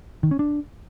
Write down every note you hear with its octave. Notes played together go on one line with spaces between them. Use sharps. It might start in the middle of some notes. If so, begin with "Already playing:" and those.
D#3
C#4
D4